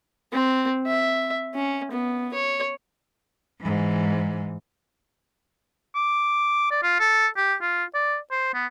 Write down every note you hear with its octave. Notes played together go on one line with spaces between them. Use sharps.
C4
E5
C#4
B3
C#5
G#2 E3
D6
D5
F4
A4
G4
F4
D5
C5
B3